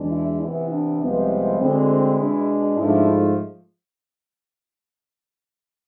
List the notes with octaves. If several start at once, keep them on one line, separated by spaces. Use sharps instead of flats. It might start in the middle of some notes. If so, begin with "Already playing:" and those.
Already playing: E2 B2 G#3 D4
E4
C3 E3 B3 E4
D4
C2 C3 F3 G#3 B3
E4
D2 D3 G#3 C4
E4
B2 G#3 D4
G#2 F3 A3 D4 E4